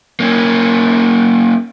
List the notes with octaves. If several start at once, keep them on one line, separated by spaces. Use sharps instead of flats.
A#3 C#4